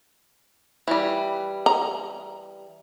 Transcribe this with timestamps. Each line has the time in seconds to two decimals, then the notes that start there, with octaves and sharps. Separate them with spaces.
0.88 E3 G3
1.66 A#5